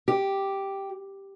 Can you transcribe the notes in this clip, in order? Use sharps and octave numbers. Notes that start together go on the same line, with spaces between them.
G4